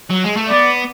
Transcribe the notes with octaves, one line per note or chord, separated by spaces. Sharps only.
F#3
G#3
A3
B3 D5